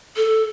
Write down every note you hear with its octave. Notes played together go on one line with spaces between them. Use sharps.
A4